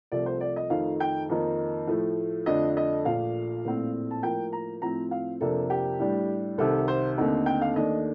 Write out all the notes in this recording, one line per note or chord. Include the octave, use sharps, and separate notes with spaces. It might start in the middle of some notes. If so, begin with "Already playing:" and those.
C2 C3 F3 A3 D5
C5
D5
D#5
F2 D#3 A3 D#4 F5
G5
F2 D#3 A#3 D#4
A2 F3 A3
F2 D3 A3 D4 D#5
D#5
A#1 A#2 A3 F5
A#1 A2 A3 C4
A5
A2 F3 A#3 G5
A#5
A2 F3 C4 A#5
F5
F2 C3 F3 A#3 D4 A4
G4
A2 G3 D4
C2 C3 D#3 A4
C5
D#2 D3 A3 C4 D#4
G5
F5
D#2 D#3 A3 D4 D#5